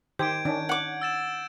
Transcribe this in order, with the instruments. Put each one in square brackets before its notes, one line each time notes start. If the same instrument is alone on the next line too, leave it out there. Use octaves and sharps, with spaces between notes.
[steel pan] D#3 G4 C5 [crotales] G6 G#6 D7
[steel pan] D#3 C#4 D4
[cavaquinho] F#5 D6
[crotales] E6 A6 E7